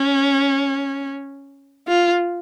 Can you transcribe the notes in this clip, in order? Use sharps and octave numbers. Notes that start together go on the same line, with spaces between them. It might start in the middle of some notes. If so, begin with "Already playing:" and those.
Already playing: C#4
F4